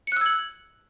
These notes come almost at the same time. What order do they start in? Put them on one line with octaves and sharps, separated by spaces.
C#7 F#6 E6 G#6 F#7